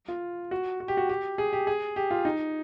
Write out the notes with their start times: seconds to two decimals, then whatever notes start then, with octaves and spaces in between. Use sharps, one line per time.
0.08 F4
0.51 F#4
0.80 F#4
0.88 G4
0.97 F#4
1.09 G4
1.38 G#4
1.53 G4
1.67 G#4
1.96 G4
2.11 F4
2.25 D#4